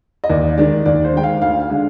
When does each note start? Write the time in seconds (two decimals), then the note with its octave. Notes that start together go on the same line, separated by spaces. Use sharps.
0.24 D#5
0.30 D#2 D5
0.57 D#3 G#3 D5
0.86 D#2 D5
1.05 C5
1.14 D#3 G#3 G5
1.23 F5
1.42 D2 F5
1.60 F5
1.70 D3 G#3